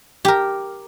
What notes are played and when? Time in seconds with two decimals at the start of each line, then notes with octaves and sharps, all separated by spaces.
0.25 G4 A#4